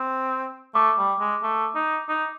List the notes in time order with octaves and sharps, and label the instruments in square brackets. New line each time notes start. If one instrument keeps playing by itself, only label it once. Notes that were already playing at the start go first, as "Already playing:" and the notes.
Already playing: [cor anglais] C4
[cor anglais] A3 [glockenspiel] D6
[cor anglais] G3
G#3
A3
D#4
D#4